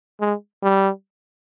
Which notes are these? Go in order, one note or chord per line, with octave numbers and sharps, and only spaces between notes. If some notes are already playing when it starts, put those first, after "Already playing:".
G#3
G3